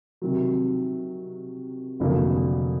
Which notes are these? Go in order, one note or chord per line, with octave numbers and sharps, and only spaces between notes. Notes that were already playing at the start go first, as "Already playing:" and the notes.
C3 D#3 F#3
F1 F2 D3 F#3 A#3